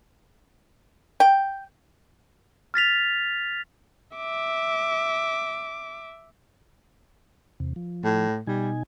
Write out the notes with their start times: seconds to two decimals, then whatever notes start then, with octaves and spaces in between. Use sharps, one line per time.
1.20 G5
2.74 F6 A6 B6 F7
4.17 E5 D6
7.60 E2 C3
7.76 F3
8.04 A2
8.47 B2 G3 D#4 G#5